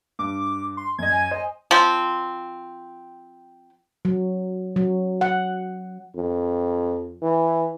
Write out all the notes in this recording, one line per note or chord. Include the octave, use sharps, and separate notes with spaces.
G2 D6
C6
F#2 D#5 G#6
G#5
C5 D#5
F3 C4
F#3
F#3
F#5
F2
E3